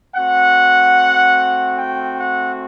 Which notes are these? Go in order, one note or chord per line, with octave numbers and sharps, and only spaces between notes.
A3 C4 F#4 F#5
G5
F#5